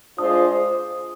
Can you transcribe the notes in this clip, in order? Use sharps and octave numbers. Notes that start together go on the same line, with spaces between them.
G#3 D4 F4 C5 D#6